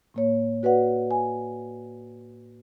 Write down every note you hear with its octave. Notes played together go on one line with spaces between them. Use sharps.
A2 A#3 C#5
F#4 B4 D5 F#5
G#5